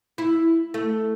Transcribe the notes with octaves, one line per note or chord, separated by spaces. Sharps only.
E4
A3